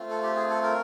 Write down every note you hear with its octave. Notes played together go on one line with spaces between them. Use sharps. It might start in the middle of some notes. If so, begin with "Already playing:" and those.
Already playing: A3 C4 F4
A4
G4
G#4
A4
A#4